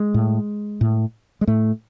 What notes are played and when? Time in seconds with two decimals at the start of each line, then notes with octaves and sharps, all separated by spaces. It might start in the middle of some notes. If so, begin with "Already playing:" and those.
Already playing: G#3
0.14 A2
0.81 A2
1.41 G#3
1.47 A2 A3